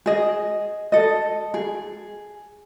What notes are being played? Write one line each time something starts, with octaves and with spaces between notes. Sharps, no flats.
G#4 D#5
A4 D#5
G#4